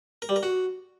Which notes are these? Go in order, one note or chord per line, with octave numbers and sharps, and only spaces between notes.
A#4
G3
A#4
F#4